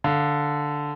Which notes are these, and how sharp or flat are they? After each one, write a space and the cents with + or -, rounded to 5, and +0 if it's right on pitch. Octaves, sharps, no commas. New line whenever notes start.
D3 +0 F5 +0